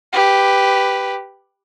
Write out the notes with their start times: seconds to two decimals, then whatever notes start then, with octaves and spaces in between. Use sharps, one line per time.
0.13 G4 B4